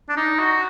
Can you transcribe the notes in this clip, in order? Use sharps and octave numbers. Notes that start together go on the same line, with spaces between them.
D4
D#4
F#4